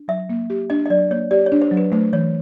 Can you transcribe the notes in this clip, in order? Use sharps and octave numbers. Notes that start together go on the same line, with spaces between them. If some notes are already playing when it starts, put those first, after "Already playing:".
Already playing: D4
F#3 E5
A#3
G4
D4 D#5
D#5
F#3 D5
A#3 C#5
G4 D5
C#5
D4
C5
F#3
B4
A3 C5
E3 C#5